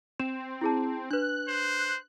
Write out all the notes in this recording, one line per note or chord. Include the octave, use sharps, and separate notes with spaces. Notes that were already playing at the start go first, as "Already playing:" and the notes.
C4 E7
E4 G#4 A5
D4 B4 F#6
C5